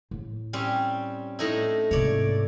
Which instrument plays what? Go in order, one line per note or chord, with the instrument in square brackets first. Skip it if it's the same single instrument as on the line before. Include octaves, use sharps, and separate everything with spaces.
[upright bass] A2
[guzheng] G3 C4 C#4
A2 D#4 E4
[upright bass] G#2 C3 [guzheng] C#5 D5